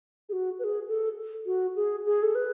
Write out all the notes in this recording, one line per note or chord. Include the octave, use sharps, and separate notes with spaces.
G#4
F#4
B4
G#4
A4
F#4
G#4
G#4
A4
B4